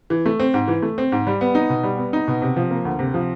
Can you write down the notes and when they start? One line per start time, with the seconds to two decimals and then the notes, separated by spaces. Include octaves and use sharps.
0.10 E3
0.26 A3
0.40 C4
0.54 G#2
0.68 E3
0.82 A3
0.98 C4
1.12 G#2
1.27 G3
1.41 B3
1.55 D#4
1.70 B2
1.83 G3
1.98 B3
2.13 D#4
2.28 B2
2.42 C3
2.57 F3
2.71 A#3
2.85 D2
2.99 C3
3.14 F3